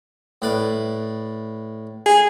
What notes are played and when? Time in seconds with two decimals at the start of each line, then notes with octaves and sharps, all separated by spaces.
0.42 A2 B4 D5
2.06 G#4